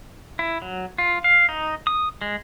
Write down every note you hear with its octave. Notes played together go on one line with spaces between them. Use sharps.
E4
F#3
F4
F5
D#4
D#6
G#3